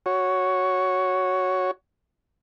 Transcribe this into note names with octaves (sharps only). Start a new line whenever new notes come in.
F#4 C#5